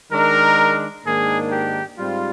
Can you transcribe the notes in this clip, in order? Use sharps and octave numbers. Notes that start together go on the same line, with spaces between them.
D#3 G#3 D4 A#4
G#2 D#3 A#3 D4 G#4
G4
G#2 G3 C4 F4